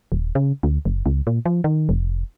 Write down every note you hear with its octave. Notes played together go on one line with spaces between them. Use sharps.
D#1
C#3
D2
F#1
C#2
A#2
F3
D#3
F1